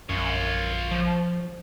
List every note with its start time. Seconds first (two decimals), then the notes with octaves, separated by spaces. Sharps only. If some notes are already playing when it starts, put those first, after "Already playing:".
0.09 A#1 F#2 F4 C#5
0.91 F3